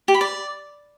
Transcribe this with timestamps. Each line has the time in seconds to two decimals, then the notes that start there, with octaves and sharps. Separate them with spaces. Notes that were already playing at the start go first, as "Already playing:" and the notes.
0.08 G4
0.14 B5
0.21 D5